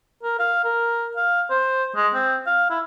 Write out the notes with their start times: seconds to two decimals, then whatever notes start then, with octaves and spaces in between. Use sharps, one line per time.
0.23 A#4
0.39 F5
0.64 A#4
1.16 F5
1.50 C5
1.96 G#3
2.14 C4
2.47 F5
2.70 E4